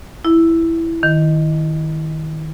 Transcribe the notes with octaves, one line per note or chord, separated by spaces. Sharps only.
E4
D#3